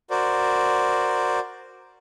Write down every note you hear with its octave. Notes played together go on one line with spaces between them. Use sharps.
F#4 A#4 C5 D5